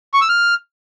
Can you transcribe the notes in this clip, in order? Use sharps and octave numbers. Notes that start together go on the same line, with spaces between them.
C#6
E6
F6